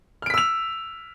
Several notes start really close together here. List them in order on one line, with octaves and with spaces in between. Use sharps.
F6 D7 B6 E6 F7